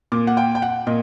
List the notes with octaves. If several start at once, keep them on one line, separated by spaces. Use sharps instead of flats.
A#2 D6
F#5
G5
G5
F#5
A#2 D#5